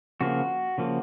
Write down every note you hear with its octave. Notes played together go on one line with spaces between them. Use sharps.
C#3 F3 A#3 F#4
C#3 F3 A#3